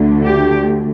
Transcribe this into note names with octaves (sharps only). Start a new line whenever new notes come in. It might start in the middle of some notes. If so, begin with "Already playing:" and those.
Already playing: D2 D3 A3
G4